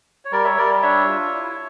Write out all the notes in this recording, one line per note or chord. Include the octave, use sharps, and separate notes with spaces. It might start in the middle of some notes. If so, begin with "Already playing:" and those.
C#5
G3 A#4 D5
C#5 E5
G3 A#4 D5
D4 C#5 E5
F4
E4